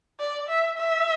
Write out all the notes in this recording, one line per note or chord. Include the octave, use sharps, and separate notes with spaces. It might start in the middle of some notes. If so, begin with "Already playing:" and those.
D5
E5
E5